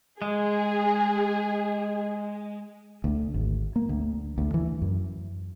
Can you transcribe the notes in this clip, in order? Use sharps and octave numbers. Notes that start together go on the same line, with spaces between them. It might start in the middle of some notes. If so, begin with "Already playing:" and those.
G#3 G#4
D2
G#1
A#3
D2
D2
E3
F#2